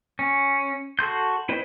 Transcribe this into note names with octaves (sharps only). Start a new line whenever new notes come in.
C#4
F#4 A4 C6 G6
E4 B4 C5 D#5